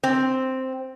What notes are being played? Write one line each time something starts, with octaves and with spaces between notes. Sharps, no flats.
C4